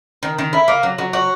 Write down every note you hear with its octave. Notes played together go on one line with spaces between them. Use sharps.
D#3
D#3
E4
A#3
F#3
F#3
F#4